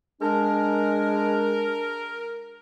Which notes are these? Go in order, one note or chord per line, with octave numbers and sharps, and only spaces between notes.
G#3 D4 A#4